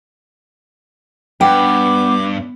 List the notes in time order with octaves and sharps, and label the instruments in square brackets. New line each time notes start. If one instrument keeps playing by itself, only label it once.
[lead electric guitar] G2 [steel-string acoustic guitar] B3 [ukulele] G5 [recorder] D6